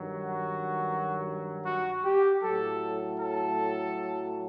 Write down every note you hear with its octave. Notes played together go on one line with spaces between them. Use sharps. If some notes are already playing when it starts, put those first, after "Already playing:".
Already playing: G2 D#3 F#3
F#4
F#4
G4
A2 F#3 A4
A4